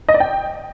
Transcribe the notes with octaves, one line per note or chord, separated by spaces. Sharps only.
D#5
D5
G5